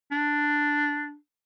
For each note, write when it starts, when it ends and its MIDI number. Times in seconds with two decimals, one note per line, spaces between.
0.12 1.15 62